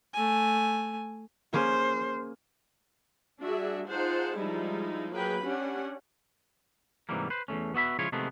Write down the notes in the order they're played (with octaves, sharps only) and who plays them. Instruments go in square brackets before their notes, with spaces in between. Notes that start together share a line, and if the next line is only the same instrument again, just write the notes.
[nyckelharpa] A3 G#5
[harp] A#3 C#4 G#4 [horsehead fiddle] C5
[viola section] G3 D4 F#4 G#4 E5
D#4 F4 G#4 C5 F#5 A5
F3 G3 G#3 D#4 E4
F#3 A#3 G#4 B4 G5 B5
C#4 D4 G4 F#5
[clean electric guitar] G#2 C3 E3 F#3 G3 A#3
B4 C5
E2 C3 A3 C#4
B3 F#4 E5 B5
C#3 F3 G#3 E4 F4 C#5
C3 D#3 F3 G#3 A3 B3